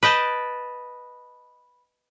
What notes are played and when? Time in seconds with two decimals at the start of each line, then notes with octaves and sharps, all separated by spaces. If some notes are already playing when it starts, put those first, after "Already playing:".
0.03 B4 D#5 G5 A5